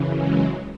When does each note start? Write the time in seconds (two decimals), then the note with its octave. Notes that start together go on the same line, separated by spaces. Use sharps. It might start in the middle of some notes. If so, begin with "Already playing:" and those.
Already playing: F#2 C#3 E3
0.14 F#3 G#3